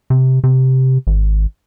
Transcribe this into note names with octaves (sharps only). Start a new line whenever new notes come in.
C3
C3
G#1